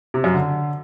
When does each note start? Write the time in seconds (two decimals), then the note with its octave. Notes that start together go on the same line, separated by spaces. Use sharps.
0.14 C3
0.24 F#2
0.34 D3